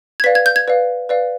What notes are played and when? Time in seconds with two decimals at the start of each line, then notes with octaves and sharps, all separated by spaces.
0.20 G#6
0.24 B4 D5 F5 B6
0.35 G#6
0.46 G6
0.56 G#6
0.68 B4 D5 F5
1.09 B4 D5 F5